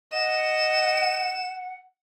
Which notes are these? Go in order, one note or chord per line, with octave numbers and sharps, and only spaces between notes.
D#5 F#5 E7